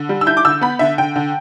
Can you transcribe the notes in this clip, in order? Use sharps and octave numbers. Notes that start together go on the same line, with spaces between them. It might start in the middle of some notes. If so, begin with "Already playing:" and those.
Already playing: D3
G3
E6
E4 G6
D6
D3 E6
B3 B5
D3 E5
D3 G5
D3